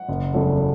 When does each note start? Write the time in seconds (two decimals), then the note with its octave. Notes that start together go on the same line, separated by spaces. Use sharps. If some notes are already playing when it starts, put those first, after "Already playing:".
Already playing: F#5
0.09 F#1
0.34 E2 C#3 F#3 A3